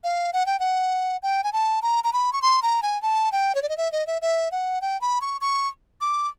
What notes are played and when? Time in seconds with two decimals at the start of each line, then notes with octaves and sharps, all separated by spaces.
0.04 F5
0.33 F#5
0.46 G5
0.59 F#5
1.23 G5
1.44 G#5
1.53 A5
1.82 A#5
2.04 A#5
2.13 B5
2.33 C#6
2.42 C6
2.62 A#5
2.82 G#5
3.02 A5
3.32 G5
3.55 C#5
3.62 D5
3.69 D#5
3.77 E5
3.92 D#5
4.07 E5
4.22 E5
4.52 F#5
4.81 G5
5.01 B5
5.21 C#6
5.41 C#6
6.01 D6